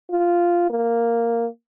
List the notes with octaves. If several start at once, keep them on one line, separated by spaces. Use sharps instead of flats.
F4
A#3